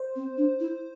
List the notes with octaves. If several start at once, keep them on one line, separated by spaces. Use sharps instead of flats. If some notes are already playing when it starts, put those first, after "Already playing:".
Already playing: C5
C4
D4
E4